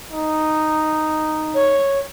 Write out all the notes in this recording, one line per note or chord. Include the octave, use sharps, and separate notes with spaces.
D#4
C#5